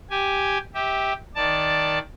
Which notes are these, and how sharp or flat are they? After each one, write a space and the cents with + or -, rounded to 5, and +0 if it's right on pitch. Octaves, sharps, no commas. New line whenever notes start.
G4 +0 G#5 +0
G4 +0 E5 -25
D#3 +10 D5 +0 A5 +5